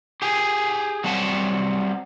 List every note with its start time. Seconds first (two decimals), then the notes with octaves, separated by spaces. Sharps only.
0.22 G4 G#4
1.04 F#3 G3 C4 F#5 A5